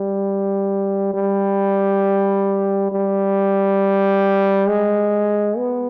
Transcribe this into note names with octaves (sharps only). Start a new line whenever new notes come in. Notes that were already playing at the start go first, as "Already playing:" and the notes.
Already playing: G3
G3
G3
G#3
B3